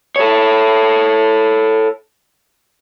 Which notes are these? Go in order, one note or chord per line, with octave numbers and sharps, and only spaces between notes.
A4 C#5